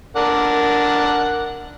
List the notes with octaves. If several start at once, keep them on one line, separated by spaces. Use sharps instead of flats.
D4 A#4 F#5